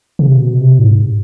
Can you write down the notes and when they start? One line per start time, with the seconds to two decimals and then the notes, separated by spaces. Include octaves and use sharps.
0.19 C#3
0.28 C3
0.37 B2
0.60 C3
0.79 A2
0.84 G#2